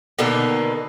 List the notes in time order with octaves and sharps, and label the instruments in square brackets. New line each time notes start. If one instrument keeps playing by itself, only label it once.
[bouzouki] B2 D3 D#3 A#3